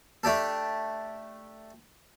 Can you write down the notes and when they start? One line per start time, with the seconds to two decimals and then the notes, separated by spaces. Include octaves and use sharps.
0.23 A3 D4 G4 A4